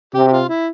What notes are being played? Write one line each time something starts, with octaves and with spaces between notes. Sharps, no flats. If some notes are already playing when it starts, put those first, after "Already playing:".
C3 G4
G4
F4
E4